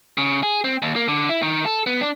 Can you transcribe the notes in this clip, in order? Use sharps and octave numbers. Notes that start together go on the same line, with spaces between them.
C#3
G#4
C4
D#2
A#3
D3
E4
D#3
A4
B3
D4